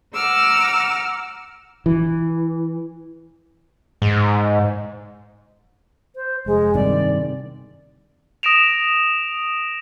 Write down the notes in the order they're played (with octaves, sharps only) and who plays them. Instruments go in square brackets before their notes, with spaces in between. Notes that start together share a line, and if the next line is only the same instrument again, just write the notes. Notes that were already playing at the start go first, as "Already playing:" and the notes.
[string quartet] F#5 A#5 D6 E6 F6
[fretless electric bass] E3
[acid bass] G#2
[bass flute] C5
[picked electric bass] F1 [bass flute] G#3
[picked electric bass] G2 C3 D#3 [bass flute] D5
[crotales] D#6 A#6 D7 E7 F7